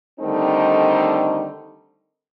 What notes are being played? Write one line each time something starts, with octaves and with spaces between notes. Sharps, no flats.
D3 D#3 G3 A3 C4 D#4